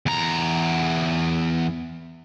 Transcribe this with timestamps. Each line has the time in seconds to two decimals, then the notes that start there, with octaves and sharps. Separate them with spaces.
0.06 E2 A#5